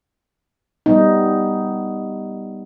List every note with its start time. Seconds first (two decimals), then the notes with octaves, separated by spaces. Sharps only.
0.86 G3 B3 D#4